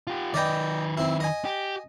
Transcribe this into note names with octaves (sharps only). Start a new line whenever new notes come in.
F4 G4
D#3 B4 D5 D#5 G5
C4 E4
D#5 G#5
G4